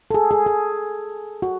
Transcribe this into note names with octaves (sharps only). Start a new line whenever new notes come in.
A4
G#4
G#4
G#4
F#4